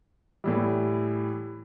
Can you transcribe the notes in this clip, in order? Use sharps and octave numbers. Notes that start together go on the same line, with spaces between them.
A2 E3 G3